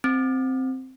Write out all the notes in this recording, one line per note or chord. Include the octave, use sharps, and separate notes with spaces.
C4